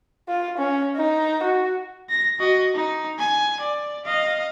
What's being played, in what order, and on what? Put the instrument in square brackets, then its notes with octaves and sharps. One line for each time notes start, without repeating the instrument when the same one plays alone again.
[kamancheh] F4
C#4
D#4
F#4
[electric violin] A#6
F#4 D#5
D#4
G#5
D5
D#5 F5